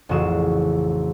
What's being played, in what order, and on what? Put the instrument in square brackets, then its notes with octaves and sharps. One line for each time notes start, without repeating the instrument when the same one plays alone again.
[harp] A1 F2 C#3 F#4 G#4 E7